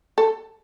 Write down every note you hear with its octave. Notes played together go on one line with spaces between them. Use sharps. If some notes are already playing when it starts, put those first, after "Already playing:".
A4